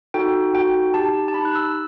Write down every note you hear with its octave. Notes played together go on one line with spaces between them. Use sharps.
D#4 F#4 A4 G5
D#4 F#4 A4 G5
D#4 G4 A5
A5
D#4 G4 B5
F#6
E6